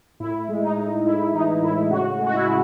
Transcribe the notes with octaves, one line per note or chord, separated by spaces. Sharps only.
A2 E4
G#3
D#4
A2
A2 E4
E3 D#4
A2 E4
C#3 F#4
G#3
F#4
E4
G#3